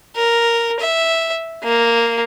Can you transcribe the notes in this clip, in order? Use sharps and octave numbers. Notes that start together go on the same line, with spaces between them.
A#4
E5
A#3